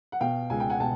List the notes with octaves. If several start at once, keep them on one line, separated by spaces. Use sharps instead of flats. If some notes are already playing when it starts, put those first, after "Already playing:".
F#5
B2 F5 G5
C#2 G#5
G5
F#5 G#5
B2 G5 A5